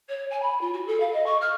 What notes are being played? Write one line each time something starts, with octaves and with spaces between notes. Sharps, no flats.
C#5
G#5
B5
F4
F#4
A4
F5
D#5
C#6
F6